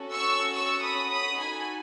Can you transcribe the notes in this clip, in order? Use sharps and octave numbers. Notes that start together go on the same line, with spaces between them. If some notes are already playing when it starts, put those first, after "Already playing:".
Already playing: C#4 F#4 A4
C#6 E6
C#6 E6
B5 D#6
B5 D#6
D#4 F#4 A4 G#5 B5